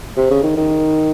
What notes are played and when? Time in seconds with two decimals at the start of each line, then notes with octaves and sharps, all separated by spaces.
0.17 C3
0.30 C#3
0.43 D#3
0.57 D#3